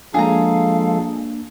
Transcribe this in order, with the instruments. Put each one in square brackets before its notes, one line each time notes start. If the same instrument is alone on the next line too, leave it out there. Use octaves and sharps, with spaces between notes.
[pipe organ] F3 G#3 A4 [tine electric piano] A#3 D4 [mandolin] G#4 A#5 [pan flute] F5